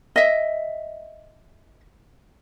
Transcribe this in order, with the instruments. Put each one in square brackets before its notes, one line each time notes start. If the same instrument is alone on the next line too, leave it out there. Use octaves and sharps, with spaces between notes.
[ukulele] D#5 E5